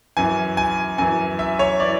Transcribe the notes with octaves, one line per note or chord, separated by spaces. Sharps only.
F#2 E3 G#5
G#5
F#2 E3 G#5
E5
C#5
E3 D5